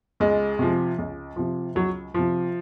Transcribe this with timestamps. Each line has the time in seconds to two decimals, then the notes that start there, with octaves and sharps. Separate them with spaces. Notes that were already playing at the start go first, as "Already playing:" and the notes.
0.20 C#2 G#3
0.59 C3 F3
0.98 C#2
1.36 C3 F3
1.75 C#2 F#3
2.14 C3 F3